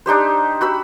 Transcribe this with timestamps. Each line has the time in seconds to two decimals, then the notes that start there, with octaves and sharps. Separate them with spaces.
0.06 D4 D#4 G4 C5
0.61 F#4 B5 E6